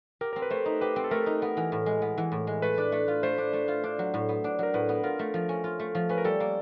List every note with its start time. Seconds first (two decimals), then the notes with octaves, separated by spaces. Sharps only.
0.21 G4 A#4
0.33 C4 A#4
0.42 B4
0.50 A3 C5
0.66 D#4
0.81 G4 B4
0.96 C4
1.04 A4
1.11 A3 A#4
1.26 D#4
1.42 B3
1.57 E3
1.72 A2
1.86 G#3
2.02 B3
2.18 E3
2.32 A2
2.47 G#3
2.62 A3 B4
2.78 D4
2.92 A3
3.08 F4
3.23 A3 C5
3.38 D4
3.53 A3
3.68 F4
3.84 D4
3.99 F#3
4.14 A2
4.29 B3
4.44 D4
4.59 F#3 A#4
4.74 A2 B4
4.89 B3
5.03 F4 A#4
5.19 A3
5.34 F3
5.49 C#4
5.64 F4
5.80 A3
5.95 F3
6.09 C#4 B4
6.18 A#4
6.25 G3 A4
6.40 A#3